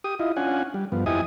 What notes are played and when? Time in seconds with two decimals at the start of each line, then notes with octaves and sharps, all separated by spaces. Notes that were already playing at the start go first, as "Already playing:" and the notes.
0.04 G4 D#6
0.20 E4 F4 D#5
0.36 C#4 D4 F4 F#5 G#5
0.74 G3
0.92 G2 F3 B3
1.06 F2 E4 G4 D#5 G#5 D#6